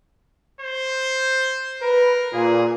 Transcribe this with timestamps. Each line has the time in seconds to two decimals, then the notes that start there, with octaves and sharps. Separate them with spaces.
0.61 C5
1.83 A#4 B4
2.34 A#2 G#4